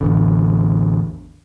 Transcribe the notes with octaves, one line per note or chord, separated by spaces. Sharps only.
A1 E2 D3